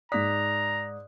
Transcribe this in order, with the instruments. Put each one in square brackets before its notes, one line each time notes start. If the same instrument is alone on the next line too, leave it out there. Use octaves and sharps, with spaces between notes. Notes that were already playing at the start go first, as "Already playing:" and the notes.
[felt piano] G#2 B6 [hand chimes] D5 D#6 F#6 [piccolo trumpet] A#5